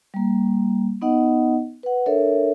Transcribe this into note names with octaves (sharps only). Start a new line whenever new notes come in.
G3 A#3
B3 D#4 D#5 F#5
B4 F#5
D4 A4 A#4 C#5 E5